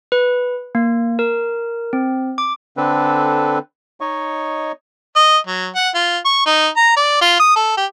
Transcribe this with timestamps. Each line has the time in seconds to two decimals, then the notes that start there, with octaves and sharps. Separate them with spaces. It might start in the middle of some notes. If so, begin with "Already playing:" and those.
0.12 B4
0.75 A#3
1.19 A#4
1.93 C4
2.38 D6
2.77 D3 C4 D4 A4 B4
4.01 D#4 C#5 D#5 C#6
5.16 D#5
5.47 F#3
5.75 F#5
5.95 F4
6.25 C#6
6.46 D#4
6.77 A#5
6.97 D5
7.21 F4
7.40 D#6
7.56 A4
7.78 G4